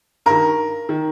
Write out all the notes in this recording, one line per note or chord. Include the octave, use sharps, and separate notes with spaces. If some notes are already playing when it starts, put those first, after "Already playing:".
G2 D#3 A#4
D#3